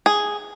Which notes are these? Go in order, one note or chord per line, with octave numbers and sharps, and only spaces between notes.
G#4